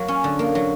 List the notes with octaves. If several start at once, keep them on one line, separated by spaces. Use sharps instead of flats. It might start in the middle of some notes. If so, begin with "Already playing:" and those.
Already playing: F#3 A#3
C#4
D3
A#3
F#3